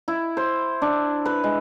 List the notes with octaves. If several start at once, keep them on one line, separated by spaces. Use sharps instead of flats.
E4
C5
D4
B4
G#3